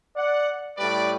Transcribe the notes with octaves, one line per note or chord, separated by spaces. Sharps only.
D5 F#5
A2 G3 B4 D5